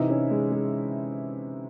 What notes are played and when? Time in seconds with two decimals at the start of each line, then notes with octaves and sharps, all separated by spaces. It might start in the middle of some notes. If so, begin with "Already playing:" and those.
Already playing: C3 E3 C4 D#4 E4
0.10 C#4
0.31 G#3
0.52 G#3